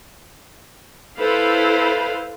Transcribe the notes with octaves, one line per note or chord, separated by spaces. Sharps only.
E4 A4 B4 C5 F5